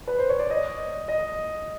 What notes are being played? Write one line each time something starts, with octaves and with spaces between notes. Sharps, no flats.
B4
C5
C#5
D5
D#5
D#5